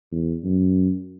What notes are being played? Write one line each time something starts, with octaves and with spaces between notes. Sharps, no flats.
E2
F#2